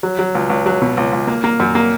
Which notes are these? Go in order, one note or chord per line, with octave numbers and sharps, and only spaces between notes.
F#3
F#3
C#2
C#2
F#3
B2
C#2
C#2
A#3
A#3
F#2
A#3